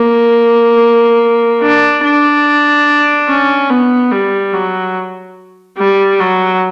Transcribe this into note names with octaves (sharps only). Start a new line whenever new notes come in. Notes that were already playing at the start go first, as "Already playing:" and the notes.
Already playing: A#3
D4
D4
C#4
B3
G3
F#3
G3
F#3